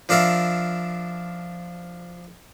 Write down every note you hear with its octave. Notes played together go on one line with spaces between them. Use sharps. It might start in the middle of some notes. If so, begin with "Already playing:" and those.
F3 D4 A#4 E5 F5